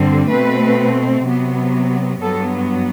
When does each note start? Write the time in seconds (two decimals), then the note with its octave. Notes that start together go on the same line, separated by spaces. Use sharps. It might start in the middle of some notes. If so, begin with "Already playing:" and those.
Already playing: G2 D3 G3 C4
0.29 B2 A3 C4 B4
1.25 C3 F#3 B3
2.22 G2 F#3 B3 A4